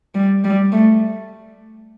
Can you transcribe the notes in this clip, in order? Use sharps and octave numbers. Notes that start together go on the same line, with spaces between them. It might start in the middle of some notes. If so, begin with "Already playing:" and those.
G3
G3
A3